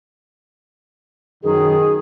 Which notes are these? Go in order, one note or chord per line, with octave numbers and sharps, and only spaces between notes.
F#2 B2 D#3 G#4